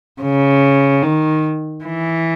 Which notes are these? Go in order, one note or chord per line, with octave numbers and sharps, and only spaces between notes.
C#3
D#3
E3